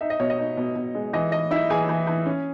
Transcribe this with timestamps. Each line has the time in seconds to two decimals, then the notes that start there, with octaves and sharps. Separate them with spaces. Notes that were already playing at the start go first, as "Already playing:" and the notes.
0.01 D#4 E5
0.10 D#5
0.20 B2 C#5
0.30 D#5
0.38 D#4
0.57 B2
0.76 B2
0.95 G#3
1.13 E3 D#5
1.32 E3 D#5
1.51 D#4 E4 E5
1.70 E3 G#4 G#5
1.89 E3
2.07 E3
2.26 C#4